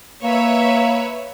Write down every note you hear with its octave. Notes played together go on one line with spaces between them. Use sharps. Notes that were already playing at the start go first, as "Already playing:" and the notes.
A#3 B4 C#5 E5